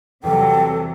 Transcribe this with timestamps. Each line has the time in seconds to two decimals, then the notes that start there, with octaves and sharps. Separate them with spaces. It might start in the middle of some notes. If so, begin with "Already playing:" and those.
0.24 E2 C3 F#3 G3 A4 G5